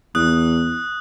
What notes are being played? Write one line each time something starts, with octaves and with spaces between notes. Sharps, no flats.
E2 D#6 F#6